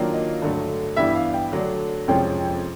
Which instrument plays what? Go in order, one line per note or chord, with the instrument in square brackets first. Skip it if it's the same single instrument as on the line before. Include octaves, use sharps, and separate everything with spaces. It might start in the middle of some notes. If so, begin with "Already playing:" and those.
Already playing: [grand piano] D#3 F#3 A#3 D4 F4
D#5
G2 D3 F#3 A3
G2 E3 G3 B3 E5
F5
G5
D3 F#3 A3 D4
F2 C3 F3 G#3 C#4 G5